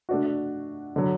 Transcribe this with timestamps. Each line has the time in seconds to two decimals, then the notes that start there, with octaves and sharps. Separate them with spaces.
0.09 A3 D4 F#4
0.96 D3 F#3